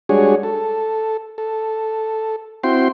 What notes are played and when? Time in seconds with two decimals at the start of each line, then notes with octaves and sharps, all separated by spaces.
0.09 G3 G#3 D4 F#4 G#4 C#5
0.43 A4
1.38 A4
2.64 C4 E4 F#4 G5 C6